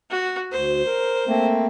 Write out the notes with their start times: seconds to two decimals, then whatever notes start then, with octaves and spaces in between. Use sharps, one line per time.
0.10 F#4
0.52 D2 C5
0.86 A#4
1.28 A3 A#3 C4